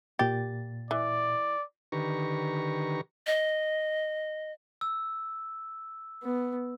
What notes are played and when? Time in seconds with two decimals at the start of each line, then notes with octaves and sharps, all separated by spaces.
0.19 A#2 G4 A6
0.91 E3 D5
1.92 D3 D#3 G4 B4 A#5 C#6
3.27 D#5
4.81 E6
6.23 B3